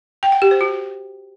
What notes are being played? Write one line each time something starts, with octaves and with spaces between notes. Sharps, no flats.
G5
F#5
G4
C5
F#4